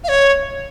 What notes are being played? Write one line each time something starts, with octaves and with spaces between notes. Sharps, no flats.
F5
C#5